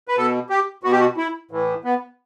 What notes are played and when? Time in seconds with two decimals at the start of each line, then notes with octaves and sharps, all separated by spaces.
0.08 B4
0.16 B2 A4
0.50 G4
0.83 B2 F#4
0.92 G4
1.00 F#4
1.17 E4
1.51 A2 E3
1.84 B3